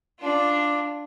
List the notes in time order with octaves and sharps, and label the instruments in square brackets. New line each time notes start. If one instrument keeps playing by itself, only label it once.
[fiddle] D4 F4